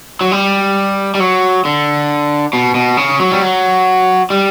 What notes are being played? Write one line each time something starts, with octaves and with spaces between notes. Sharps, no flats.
F#3
G3
G3
F#3
D3
B2
B2
C#3
F#3
G3
F#3
G3